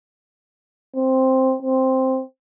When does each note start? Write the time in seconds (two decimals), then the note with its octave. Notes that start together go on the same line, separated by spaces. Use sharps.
0.96 C4
1.62 C4